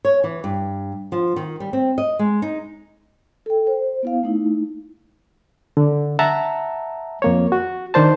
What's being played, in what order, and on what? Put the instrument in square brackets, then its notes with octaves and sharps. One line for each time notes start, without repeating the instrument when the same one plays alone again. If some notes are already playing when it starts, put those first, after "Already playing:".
[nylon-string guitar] C#5
E3
G2
F3
D#3
G3
C4
D#5
G#3
D#4
[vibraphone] A4 G5
C5
B3 E4 F5
A3 D#4 E4
[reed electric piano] D3
E5 F#5 A5 A#5
F2 A#3 C#5
F#4
D#3 D4 C5 A5